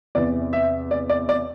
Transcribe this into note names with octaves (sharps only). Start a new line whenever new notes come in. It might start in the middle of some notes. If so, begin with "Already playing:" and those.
E2 C3 E3 D5
E5
D5
D5
D5